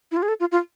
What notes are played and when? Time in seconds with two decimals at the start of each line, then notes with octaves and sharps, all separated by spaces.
0.12 E4
0.17 F4
0.23 G#4
0.28 A4
0.40 F4
0.52 F4